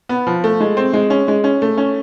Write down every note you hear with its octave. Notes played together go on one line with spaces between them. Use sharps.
B3
F3
A3
G#3
C4
G#3
C#4
G#3
C#4
A3
C#4